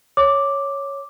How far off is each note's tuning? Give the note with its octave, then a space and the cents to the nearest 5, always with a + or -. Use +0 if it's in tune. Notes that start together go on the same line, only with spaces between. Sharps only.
C#5 +0 D6 +0